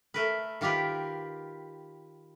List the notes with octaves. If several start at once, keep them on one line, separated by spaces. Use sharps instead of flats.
A3 A#4 B4
D#3 F4 G4 A#4 B4